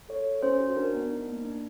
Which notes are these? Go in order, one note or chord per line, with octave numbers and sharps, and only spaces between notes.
A4 C#5
A4
C#4 C5
F#4
D4 A#4
B3
D#4
A#3
D4